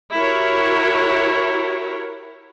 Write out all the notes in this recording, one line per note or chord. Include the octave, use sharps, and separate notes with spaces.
E4 F#4 G4 A#4 C#5